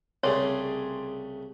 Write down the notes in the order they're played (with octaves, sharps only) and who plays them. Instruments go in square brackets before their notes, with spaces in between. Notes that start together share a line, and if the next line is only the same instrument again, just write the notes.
[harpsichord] C2 C#3 A3 [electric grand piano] G#4 D5 C6 [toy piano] C#5